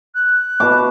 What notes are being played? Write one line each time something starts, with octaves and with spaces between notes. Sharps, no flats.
F#6
B2 A5 D6